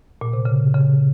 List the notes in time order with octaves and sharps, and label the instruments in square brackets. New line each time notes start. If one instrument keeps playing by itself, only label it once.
[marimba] A#2
C3
C#3
C#3